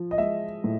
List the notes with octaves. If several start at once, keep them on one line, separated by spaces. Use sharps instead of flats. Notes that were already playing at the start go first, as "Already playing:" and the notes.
Already playing: F3
D#5
G#3 E5
A2